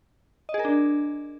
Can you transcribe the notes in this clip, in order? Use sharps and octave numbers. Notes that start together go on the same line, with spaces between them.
D#5
G#4
A#4
D4